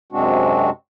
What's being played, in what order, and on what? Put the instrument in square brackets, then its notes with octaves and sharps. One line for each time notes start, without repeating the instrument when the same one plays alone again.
[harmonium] F#2 C3 G#3 C4 D4 F#4